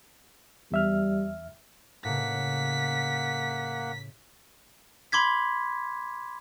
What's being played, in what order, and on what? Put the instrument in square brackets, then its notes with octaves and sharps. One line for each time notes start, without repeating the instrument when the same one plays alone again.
[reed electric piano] E2 E5 F6 [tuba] G3
[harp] A2 C#3 [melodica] A#3 F#5 [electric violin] B6
[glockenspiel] B5 C6 D6 G#6 B6